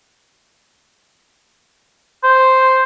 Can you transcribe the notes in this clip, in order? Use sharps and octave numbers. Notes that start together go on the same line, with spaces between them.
C5